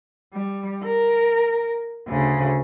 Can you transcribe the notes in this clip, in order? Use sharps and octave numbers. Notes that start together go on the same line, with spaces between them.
G3
A#4
D2 C#3